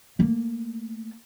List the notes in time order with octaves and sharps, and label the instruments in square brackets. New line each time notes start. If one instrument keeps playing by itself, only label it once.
[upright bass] A3 A#3